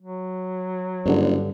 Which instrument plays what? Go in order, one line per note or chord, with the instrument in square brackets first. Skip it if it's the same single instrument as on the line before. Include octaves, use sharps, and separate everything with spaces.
[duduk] F#3
[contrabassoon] F#1 [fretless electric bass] G2 D3